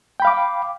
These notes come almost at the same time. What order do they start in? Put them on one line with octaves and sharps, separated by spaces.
G5 B5 F5 D6